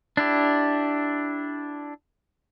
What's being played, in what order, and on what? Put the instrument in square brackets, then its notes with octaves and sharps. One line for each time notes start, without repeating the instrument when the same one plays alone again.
[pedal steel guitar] D4 E4 G4